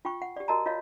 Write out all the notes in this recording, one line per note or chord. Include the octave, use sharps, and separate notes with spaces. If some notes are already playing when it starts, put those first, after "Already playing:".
F4 G5 C#6
F#5
G4 D5
F#4 A#4 D#5 A5 A#5
F4 C#5 D#5 F5